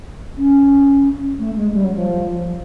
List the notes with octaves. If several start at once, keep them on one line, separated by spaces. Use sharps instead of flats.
C#4
A3
G#3
G3
F#3
F3
F3